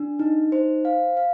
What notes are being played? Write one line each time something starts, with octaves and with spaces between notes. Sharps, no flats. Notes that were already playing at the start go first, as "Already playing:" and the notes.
Already playing: D4
D#4
C5
F5
F5